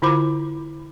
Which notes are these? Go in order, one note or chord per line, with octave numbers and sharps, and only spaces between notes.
D3 E4 F4 C5 B5 D6